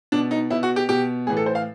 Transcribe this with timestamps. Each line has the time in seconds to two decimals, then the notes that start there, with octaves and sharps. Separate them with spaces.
0.12 B2 D4
0.31 D#4
0.50 B2 E4
0.63 F#4
0.76 G4
0.89 B2 G4
1.27 A2 E3 G#4
1.37 A4
1.46 C5
1.55 F5